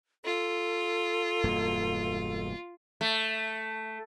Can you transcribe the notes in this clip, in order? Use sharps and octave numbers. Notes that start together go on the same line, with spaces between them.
F4 A4
E1 G2 A#3
A3